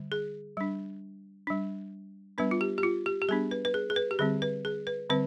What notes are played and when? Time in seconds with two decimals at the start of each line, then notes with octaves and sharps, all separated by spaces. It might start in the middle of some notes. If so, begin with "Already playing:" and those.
Already playing: D3 G3
0.12 G#4
0.57 G3 D4
1.47 G3 D4
2.38 G3 B3 D4 B4
2.51 F4
2.61 G4
2.78 G4
2.83 F4
3.06 G4
3.22 G4
3.29 G3 B3 D4 G#4
3.51 B4
3.65 B4
3.74 G#4
3.90 G#4
3.96 B4
4.11 G4
4.19 D3 G3 C4 G#4
4.42 B4
4.65 G#4
4.87 B4
5.10 D3 G3 C4 B4